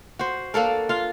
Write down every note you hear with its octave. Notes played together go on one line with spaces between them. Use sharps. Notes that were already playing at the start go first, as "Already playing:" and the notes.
F#4 C5
A#3 D4 A4 A#4
F4 F5